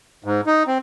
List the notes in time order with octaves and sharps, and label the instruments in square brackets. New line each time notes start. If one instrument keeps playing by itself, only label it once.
[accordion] G#2
D#4
C4